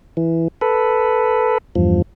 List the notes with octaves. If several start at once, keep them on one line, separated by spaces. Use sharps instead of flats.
E3
A4 B4
E2 G2 F3